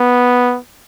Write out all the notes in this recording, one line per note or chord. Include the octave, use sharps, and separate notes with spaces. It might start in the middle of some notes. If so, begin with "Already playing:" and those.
Already playing: B3